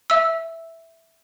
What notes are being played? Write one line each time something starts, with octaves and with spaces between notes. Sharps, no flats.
E5 E6